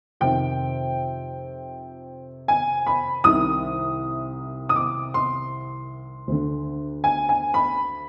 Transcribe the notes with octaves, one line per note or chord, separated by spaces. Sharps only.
F2 C3 D#3 G5
G#5
B5
C2 C3 D#3 D#6
D#6
D6
C6
D2 D3
G#5
G#5
B5